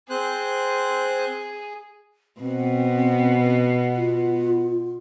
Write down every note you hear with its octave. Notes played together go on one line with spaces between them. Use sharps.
C4 G#4 C5 F#6
B2 B3 C4
F4